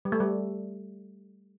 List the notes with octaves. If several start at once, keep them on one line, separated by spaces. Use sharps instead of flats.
G3
A3
G3